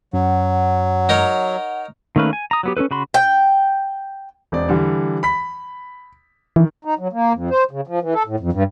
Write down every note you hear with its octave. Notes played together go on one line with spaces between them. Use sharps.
F#2 F#3 F#5
D#4 A#4 C#5
D#3 A3 A#3 C#4 B4
G#5
A#5 D#6
F#3 B3 G4
C#4 E4 A4 B4
C#3 F#4 B5 C6
G5
E1 C4 D5
D3 E3 G3
B5 B6
D#3 E3
D#4
F#3
A#3
F2
C5
C#3
F3
E3
A4
A2
F2
G2